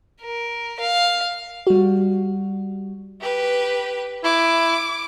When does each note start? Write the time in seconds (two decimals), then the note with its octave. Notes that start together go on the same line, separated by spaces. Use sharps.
0.22 A#4
0.80 F5
1.67 G3 F#4
3.21 G4 B4
4.24 E4 D6